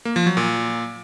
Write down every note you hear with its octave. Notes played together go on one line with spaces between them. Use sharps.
A#3
F3
F#3
A#2